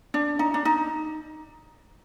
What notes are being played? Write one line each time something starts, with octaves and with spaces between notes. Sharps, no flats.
D4
D#4
D4
D#4